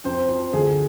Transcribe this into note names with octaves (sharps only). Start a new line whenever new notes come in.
F2 C5
F3 C5
D2 G#4